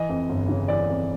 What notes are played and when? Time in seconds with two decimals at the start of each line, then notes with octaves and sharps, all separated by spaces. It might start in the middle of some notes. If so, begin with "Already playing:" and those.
Already playing: E3 D#5
0.09 F2
0.29 G1
0.48 C#3
0.68 E3 D5
0.89 F2